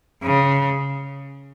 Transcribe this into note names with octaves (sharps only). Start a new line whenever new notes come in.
C#3